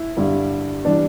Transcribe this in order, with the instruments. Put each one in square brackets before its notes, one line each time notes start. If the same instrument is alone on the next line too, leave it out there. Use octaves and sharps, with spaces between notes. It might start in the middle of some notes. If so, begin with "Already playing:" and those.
Already playing: [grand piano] E4
G2 D3 G3
E3 G3 D4